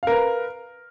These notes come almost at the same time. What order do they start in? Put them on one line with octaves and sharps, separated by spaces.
F5 A#4 B4